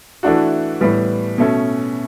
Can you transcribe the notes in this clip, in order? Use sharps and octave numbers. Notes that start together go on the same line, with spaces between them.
E3 A3 D4 F#4
A2 E3 G3 B3
B2 A3 C#4